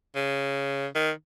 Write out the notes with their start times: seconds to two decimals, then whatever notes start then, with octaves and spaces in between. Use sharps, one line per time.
0.15 C#3
0.95 D#3